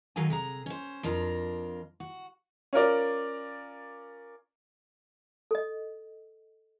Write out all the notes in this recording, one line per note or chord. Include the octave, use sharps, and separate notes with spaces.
F#2 D#3 F#3 A4 F5 G#5
C3 G#4 A#5
C#4 C5
F2 D4 F4 A#4
F#4
C#4 F4 A#4 D5
A4 D#5